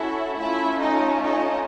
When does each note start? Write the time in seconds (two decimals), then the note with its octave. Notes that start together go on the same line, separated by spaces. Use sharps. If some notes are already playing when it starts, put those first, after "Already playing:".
Already playing: C#4 E4 F#4 A4 E5
0.37 A3 C#4 E4 F4 E5
0.80 D#4 D#5
1.23 D#4 D#5